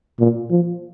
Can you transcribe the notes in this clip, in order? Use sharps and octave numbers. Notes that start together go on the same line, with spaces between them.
A#2
F3